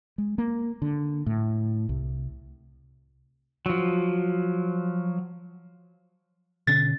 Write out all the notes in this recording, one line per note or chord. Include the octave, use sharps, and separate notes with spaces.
G#3
A#3
D3
A2
C2
F3 F#3
B2 D3 C#4 A6